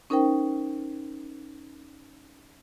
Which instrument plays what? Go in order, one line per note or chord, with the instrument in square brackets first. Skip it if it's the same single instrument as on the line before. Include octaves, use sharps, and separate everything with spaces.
[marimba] C#4 D#4 A#4 C5 G5